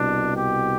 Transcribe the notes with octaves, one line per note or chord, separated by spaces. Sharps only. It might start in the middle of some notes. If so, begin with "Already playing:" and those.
Already playing: C2 B2 D4
G4